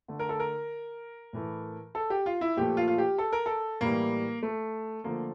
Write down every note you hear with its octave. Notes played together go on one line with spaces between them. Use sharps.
D3 A3
A#4
A4
A#4
A2 E3 A3
A4
G4
F4
E4
A#2 F3 A3 G4
F4
F4
G4
A4
A#4
A4
A2 E3 G3 A#3
A3
D3 F3 A3 A#3